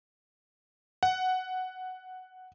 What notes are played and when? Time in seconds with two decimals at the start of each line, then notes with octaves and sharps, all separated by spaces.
1.03 F#5